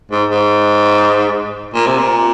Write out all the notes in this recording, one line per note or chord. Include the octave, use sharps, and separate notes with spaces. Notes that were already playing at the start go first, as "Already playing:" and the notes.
G#2
G#2
A#2
C3
A#2